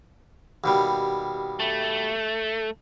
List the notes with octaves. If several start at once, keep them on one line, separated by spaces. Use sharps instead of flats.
D#2 B2 G3
A3